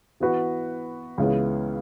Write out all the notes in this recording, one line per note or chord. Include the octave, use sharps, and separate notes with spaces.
E3 B3 F#4 B4
C#2 C#3 E3 B3